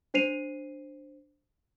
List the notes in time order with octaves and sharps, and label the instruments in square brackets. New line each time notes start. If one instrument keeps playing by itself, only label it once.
[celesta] D4 C5 C7 D#7 F7